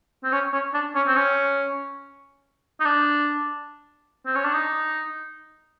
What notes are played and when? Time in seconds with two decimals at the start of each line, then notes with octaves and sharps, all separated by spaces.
0.24 C4
0.32 C#4
0.53 C#4
0.74 D4
0.96 C#4
1.07 C4
1.16 C#4
2.80 D#4
2.85 D4
4.26 C4
4.35 C#4
4.45 D4
4.53 D#4